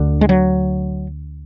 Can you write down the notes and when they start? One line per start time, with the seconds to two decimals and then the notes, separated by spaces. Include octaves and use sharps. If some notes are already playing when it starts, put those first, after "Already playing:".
Already playing: D2 D3
0.21 G#3
0.29 F#3